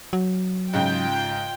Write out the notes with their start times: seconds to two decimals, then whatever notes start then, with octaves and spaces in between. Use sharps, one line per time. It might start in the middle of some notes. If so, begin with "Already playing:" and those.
0.13 F#3
0.73 G#2 C#3 F4 G5